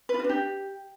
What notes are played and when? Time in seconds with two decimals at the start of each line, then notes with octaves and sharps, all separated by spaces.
0.09 B4
0.14 F4
0.19 F#4
0.24 D4
0.29 G4